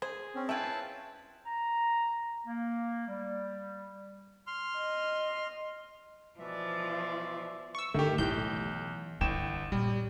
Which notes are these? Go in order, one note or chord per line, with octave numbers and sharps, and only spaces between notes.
G#4 C5
C4 C#4
E4 F4 B4 E5 G5 A5
A#5
A#3
G3
C6 F6
D#5
B2 E3 F3 D5 E5
C#6 E6
G2 D3 D#3 A3 G4
B1 A2 E3 G6
G1 D#4 E4 G5 E7
A#2 G3